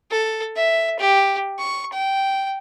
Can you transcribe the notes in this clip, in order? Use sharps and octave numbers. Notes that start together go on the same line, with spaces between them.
A4
E5
G4
C#6
G5